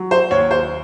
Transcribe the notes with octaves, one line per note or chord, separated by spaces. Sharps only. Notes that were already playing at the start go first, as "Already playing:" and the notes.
Already playing: F#3
C5
D#2 C#5
C5